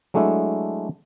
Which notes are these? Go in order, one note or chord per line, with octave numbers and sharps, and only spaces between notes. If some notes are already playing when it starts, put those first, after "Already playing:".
F#3 G#3 A3 D4 E4